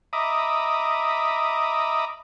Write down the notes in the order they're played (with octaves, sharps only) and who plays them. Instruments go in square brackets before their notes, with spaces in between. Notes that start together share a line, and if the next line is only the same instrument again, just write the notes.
[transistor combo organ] D#5 E5 A#5 B5 D6 D#6